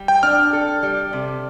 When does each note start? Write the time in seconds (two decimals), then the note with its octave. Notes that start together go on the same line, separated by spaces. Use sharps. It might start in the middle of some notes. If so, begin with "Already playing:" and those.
Already playing: G3
0.08 G5
0.23 D4 F6
0.53 A4
0.83 G3
1.13 C3